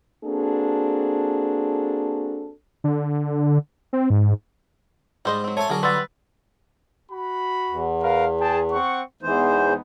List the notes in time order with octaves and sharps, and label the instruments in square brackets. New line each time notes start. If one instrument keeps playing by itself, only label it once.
[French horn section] A#3 C4 D4 F#4 G#4 A4
[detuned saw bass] D3
C4
G#2
[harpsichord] G#2 [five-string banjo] G3 C5 D#5
[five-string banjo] F#3 C4
[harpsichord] A3 G#5 [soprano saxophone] C#5 [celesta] A5
[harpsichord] D3 F#3 [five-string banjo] B3 A#4 [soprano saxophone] G#4
[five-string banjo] G3 F#5 [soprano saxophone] B4 [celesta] C6 E6 A6
[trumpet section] F#4 B5
[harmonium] E2
[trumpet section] A#4 B4 F5
G#4 G5 A5
C4 F#5 C#6
[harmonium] E2 E3 C5 [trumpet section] G#3 B3 D#4